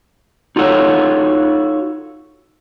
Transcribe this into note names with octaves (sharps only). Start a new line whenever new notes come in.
D#4 F4 F#4 A4 C#5